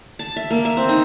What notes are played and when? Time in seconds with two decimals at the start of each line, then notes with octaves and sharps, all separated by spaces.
0.19 A5
0.36 E5
0.50 A#3
0.65 E5
0.77 C4
0.89 D#4